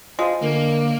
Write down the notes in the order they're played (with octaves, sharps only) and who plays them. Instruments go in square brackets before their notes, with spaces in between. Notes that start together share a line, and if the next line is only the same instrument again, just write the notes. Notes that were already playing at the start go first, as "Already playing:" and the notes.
[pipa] G#3 [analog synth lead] F4 [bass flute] C5
[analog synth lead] D3 [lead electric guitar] A#3 [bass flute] A#4